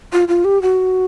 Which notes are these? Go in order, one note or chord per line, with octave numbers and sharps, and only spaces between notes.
F4
F4
G4
F#4